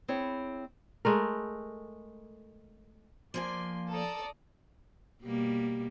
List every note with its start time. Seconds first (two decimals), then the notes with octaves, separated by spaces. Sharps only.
0.08 C4 E4 G#4 C#5
1.05 G#3 A3 A#4
3.34 F3 A#3 D5 G#5 C6
3.90 A4 D5 A#5 D#6
5.23 B2 G3 A#3